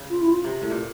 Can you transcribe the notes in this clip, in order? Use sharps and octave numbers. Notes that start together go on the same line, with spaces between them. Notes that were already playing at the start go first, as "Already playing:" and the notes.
Already playing: C#3
F4
E4
F4
C3
A2
A#2